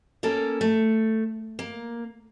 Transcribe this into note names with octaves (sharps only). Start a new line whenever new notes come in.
A#3 C#4 A4 A#4
A3
A#3